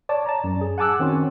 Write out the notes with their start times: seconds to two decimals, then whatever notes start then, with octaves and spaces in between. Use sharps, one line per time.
0.09 C#5 D5 A5
0.26 A5 A#5
0.44 F#2
0.61 G#4
0.78 F#5 G#5 A5 D6 E6 F#6
0.99 D#3 C4 C#4 F#4 C6